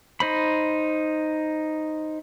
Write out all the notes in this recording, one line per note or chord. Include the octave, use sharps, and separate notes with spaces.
D#4 C5 B5